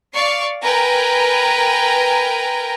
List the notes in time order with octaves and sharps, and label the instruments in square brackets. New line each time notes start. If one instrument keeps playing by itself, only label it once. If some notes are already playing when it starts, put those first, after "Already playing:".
[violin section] D5 F5 C#6 C7
A#4 B4 G5 G#5 A#5